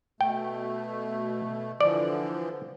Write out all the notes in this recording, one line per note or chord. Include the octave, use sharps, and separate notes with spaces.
B2 A3 G5
D3 E3 F3 D5